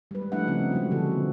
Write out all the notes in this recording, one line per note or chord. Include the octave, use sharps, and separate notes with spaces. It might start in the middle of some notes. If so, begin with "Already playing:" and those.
G3 G#3 B4
F3 A3 D4 E4 E5 F#5
C#3 F3 A3 C4 C#4 D#4
F#3 G#3 A3 D#4 F#4
B2 D3 F3 F#4 A4
B3